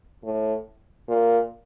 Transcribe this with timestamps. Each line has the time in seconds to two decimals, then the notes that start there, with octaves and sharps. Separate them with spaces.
0.24 A2
1.08 A#2